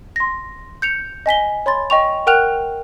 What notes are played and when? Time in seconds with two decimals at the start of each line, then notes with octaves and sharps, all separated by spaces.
0.16 C6 A#6
0.82 G6 C#7 F7
1.26 D#5 G#5 B6 G7
1.66 C#5 B5 C6 A6
1.90 D#5 G5 C#6 F7
2.27 A#4 F#5 G5 F6 F#6 F7